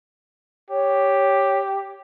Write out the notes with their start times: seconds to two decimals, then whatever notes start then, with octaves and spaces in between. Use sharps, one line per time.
0.70 G4 C#5